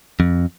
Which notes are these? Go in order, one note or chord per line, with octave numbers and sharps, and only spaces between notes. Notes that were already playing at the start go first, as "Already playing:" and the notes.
F2